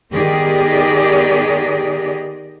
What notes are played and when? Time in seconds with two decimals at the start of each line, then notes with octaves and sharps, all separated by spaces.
0.12 D#3 B3 G4 G#4 D5 D#5